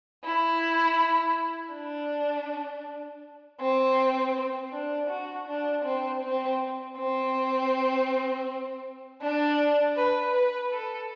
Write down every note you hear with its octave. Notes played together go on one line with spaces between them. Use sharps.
E4
D4
C4
D4
F#4
D4
C4
C4
C4
D4
B4
B4
A4